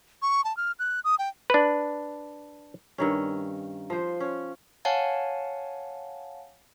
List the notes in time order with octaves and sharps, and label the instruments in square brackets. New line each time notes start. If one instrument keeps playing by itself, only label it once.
[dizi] C#6
A5
F6
F#6
D#6
G5
[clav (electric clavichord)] D4 B4
[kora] G2 D#3 C#4
F3 C5
C#4
[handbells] C#5 F5 F#5 G#5 A5